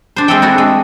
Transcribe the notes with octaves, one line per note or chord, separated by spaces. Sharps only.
D4 C5
G#3 C4 A4 E5 F#5 G5
D4 E4 F#4 F#5
G#3